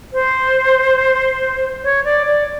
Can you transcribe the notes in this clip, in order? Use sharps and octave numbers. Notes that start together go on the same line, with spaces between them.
C5
C#5
D5
D5